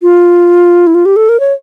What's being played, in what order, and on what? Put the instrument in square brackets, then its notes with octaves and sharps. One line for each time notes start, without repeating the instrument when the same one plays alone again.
[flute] F4
E4
F4
G4
A4
A#4
C#5